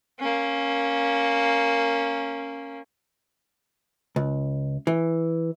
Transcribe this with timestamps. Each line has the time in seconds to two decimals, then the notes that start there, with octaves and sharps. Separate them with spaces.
0.19 A#3 C#4
4.16 C#2
4.87 E3